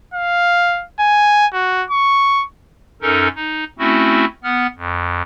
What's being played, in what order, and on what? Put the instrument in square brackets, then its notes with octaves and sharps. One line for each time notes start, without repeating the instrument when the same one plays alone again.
[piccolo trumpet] F5
G#5
F#4
C#6
[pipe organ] F#2 C#4 D#4 A4 A#4
D#4
A3 C4 C#4 E4 F#4
B3 F#5 F6
F2